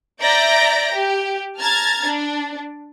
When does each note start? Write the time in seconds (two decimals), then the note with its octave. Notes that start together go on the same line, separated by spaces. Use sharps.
0.21 D5 E5 A#5 G6 A#6 D7
0.94 G4
1.59 A5 A#5 F6 G#6 A6
2.04 D4